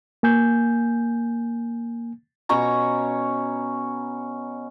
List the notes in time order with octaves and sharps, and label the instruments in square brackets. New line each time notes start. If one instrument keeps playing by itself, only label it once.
[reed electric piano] A#3 G#5 G6
[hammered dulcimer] B2 C#4 C#5 A#5